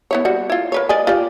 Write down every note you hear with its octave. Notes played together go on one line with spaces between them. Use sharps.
B3 E4 C#5
G3 F#4
E4 F4
A#4 B4 C#5
D5 D#5 G#5
F4 G4 D5